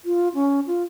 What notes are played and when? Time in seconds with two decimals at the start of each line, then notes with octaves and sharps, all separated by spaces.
0.05 F4
0.34 C#4
0.67 F4